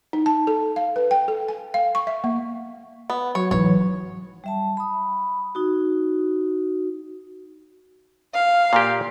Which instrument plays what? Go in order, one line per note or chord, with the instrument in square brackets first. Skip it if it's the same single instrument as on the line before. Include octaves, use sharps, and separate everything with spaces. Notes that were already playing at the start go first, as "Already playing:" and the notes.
[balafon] D#4
A5
A4
F5
B4
G5
A4
G#5
F5
C#6
E5
A#3
[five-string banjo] B3
[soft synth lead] F#3 [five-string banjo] C#5
[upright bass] E3 D#4 [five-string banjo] C#5
[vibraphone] G3 E5 A5
B5 D#6
D#4 F#4
[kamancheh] F5
[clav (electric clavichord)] A#2 A#3 G4